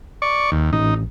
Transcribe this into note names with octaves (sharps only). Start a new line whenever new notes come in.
D5 C#6
D#2
A1 D#4